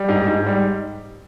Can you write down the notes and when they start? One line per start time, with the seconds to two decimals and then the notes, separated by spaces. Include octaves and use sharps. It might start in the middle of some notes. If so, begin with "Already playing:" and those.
Already playing: G3
0.09 G#2
0.27 G#2
0.47 G3